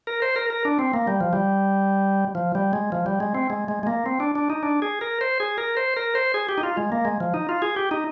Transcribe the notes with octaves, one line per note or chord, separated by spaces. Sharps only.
A#4
C5
A#4
A#4
D4
C4
A#3
G3
F3
G3
F3
G3
G#3
F3
G3
G#3
C4
G#3
G#3
G#3
A#3
C4
D4
D4
D#4
D4
G#4
A#4
C5
G#4
A#4
C5
A#4
C5
G#4
G4
D#4
F4
G#3
A#3
G#3
F3
D#4
F4
G#4
G4
D#4